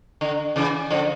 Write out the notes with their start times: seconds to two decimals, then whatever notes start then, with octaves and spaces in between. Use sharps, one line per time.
0.21 D3
0.56 C#3 E3
0.91 D3 F3